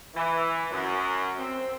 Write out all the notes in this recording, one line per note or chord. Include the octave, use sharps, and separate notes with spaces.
E3
F#2
C4